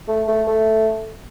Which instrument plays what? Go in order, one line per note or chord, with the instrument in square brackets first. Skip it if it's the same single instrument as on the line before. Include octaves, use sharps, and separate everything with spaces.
[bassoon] A3
A3
A3